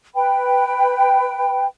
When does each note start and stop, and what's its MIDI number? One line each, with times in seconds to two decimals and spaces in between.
0.15 1.65 71
0.15 1.65 79
0.15 1.65 83